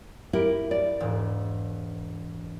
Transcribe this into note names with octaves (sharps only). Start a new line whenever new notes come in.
E4 G4 A#4
D5 A6
E1 G#2